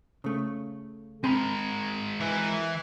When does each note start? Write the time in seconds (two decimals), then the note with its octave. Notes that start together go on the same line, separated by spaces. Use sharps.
0.24 C#3 A3
1.24 G#3 C4 A#4 B5
2.20 E3